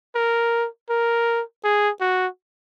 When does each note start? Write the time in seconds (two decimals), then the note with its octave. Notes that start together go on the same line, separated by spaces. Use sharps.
0.15 A#4
0.90 A#4
1.64 G#4
2.01 F#4